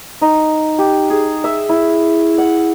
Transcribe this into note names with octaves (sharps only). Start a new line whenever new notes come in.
D#4
G4
G#4
E5
E4
F#5